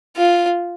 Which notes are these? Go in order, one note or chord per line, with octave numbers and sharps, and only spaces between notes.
F4